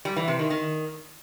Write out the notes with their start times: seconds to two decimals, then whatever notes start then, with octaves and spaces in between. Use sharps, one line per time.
0.05 G3
0.16 E3
0.28 C3
0.39 D#3
0.50 D#3